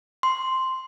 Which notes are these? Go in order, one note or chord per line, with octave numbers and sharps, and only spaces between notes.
C6